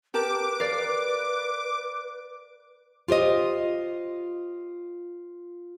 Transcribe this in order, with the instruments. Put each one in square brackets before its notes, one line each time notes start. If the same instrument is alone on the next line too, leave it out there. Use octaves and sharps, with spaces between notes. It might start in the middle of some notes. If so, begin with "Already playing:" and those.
[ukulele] G4 A#4 A5 [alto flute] B4 [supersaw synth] D6
[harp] A#4 D5 [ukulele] F5
[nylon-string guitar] F4 G4 C5 D#5